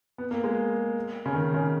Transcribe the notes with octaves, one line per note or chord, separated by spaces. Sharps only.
B3
A#3
G#3
C#3
D#3
C#3